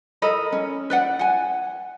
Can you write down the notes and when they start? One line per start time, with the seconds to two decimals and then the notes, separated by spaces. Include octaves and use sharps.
0.22 A4 A#4 D#5 B5
0.52 C#4
0.90 B4 D5 F#5
1.19 F#5 G#5